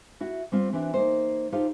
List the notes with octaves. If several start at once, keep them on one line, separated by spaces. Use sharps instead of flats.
E4 F#4
G3 C4 F4
E3 C4 D4 E4 F#4
A#3 D#4 C5
D#4 F4 G4 A4 C5 F5